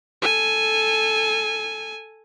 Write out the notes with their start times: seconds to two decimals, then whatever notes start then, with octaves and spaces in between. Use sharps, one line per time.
0.22 A4 G#5